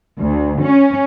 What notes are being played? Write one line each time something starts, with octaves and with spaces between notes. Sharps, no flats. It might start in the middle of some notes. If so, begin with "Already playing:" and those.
D2
C#4